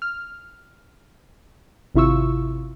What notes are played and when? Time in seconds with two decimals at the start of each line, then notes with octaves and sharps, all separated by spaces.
0.02 F6
1.95 G#1 C3 E4 F4 C#6 E6